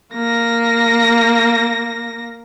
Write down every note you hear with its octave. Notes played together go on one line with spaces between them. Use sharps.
A#3 A#6